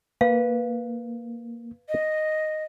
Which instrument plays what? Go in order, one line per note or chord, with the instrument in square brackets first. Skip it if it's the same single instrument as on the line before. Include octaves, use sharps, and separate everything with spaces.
[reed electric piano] A#3 [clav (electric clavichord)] B4 [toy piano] F5
[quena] D#5